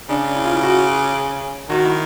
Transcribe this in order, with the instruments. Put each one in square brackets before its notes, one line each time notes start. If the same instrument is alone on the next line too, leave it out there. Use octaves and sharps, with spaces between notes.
[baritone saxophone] C#3 [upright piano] D4
[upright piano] E4
F4
E4
F#4
[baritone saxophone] D#3 [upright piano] F#4
[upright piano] E4